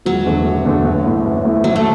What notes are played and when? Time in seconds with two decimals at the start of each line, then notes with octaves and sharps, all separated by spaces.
0.06 E1 F#3
0.26 E2 D3 A3 D4
0.45 E1
0.65 E2 D3 A3 D4
0.85 A1
1.05 A2 A3 E4
1.25 A1
1.44 A2 A3 E4
1.64 F#1 F#3
1.76 A3